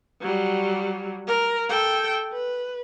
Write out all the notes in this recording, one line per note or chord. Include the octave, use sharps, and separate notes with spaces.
F#3 G3
A#4
A4 G5
B4